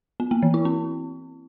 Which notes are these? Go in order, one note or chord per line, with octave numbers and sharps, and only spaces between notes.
B3
A#3
E3
E4
C4